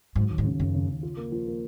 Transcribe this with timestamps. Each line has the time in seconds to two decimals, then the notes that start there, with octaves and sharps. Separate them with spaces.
0.15 G#2 F#3
0.30 D#2
0.38 G#2
0.44 C#3
0.59 F#2 C#3
0.74 C#3
0.89 C#3
1.03 F4
1.17 A#3
1.32 F3
1.47 A#3